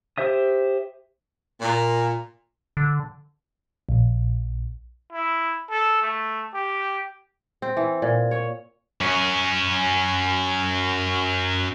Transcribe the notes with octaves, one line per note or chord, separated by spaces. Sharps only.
G4 C5 E5 D#6
A#2
D3
A#1
E4
A4
A3
G4
C4
E3
A#2
C#5
F#2 C#4